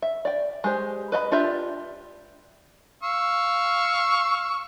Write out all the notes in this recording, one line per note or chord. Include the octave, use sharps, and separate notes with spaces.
E5
D5 G5
G#3 G4 C5
B4 D#5 E5 B5
D4 F4 G4 D5 E5
F5 C#6 E6